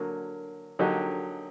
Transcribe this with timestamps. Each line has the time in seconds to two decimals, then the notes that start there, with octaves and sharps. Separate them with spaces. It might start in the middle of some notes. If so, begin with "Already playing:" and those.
Already playing: D3 F#3 A#3
0.79 D3 F#3 A#3 D#4 G4